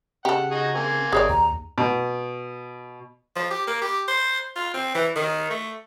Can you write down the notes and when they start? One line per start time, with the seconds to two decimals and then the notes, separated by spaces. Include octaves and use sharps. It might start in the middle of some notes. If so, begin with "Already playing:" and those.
0.25 C#3 G4 A4 F#5
0.51 D#4 F#4 G#4
0.75 A#3 C4 G#5
1.12 G#1 G#4 C#5 D5
1.29 D#2 A#5
1.78 B2
3.35 F3
3.50 G4
3.67 A#3
3.81 G4
4.08 C5
4.56 F4
4.74 C4
4.95 E3
5.15 D#3
5.50 A3